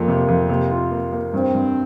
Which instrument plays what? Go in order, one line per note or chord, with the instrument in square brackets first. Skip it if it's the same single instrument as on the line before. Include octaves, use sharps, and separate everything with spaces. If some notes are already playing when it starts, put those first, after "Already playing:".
Already playing: [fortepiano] F2 F3 [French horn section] A#3
[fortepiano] C3
F2
C3
F4
A#3
A#3
[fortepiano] G2 [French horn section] C4
[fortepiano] G2